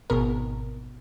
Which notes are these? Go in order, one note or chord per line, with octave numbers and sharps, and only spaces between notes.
G#1 B2 A#4